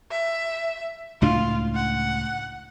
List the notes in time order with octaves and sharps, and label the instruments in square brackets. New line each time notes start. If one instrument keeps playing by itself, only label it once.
[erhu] E5
[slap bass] C#2 A2 D4 [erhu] F4
[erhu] F#5